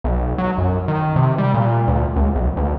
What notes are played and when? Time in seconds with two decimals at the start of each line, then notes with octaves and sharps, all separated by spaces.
0.04 B1
0.38 F#3
0.58 F#2
0.88 D#3
1.16 C3
1.38 G3
1.54 A#2
1.87 D2
2.16 C#2
2.35 B1
2.57 D2